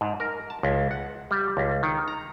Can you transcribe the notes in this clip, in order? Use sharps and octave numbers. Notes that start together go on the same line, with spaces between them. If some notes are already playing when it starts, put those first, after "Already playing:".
G#2
A#4
A5
C#2
F#5
G3
C#2
D#3
A#5